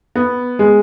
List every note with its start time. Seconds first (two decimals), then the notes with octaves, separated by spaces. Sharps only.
0.15 B3
0.59 G#3